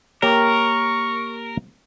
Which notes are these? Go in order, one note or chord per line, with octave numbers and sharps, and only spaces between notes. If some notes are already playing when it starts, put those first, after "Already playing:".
A#3 G4 A#4 C#5 C#6